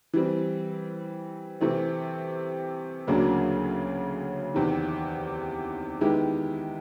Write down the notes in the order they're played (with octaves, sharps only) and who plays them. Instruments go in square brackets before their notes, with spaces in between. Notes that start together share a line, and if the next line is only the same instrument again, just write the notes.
[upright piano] E3 G3 C4
C3 E3 A3 C4
D2 C#3 F#3 A#3 D4
E2 C3 D#3
D#3 G#3 B3 E4 G4